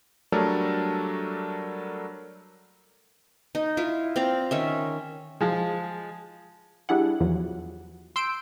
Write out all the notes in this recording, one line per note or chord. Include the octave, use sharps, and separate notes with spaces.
F#3 G3 A3 D4 A4 A#4
D#4
E4 F4
C4 D5 F5 A#5
D#3 C#4 E5
F3 G#3
G3 D4 E4 G#4 F#5
E2 F3 F#3
C6 E6 G6 D7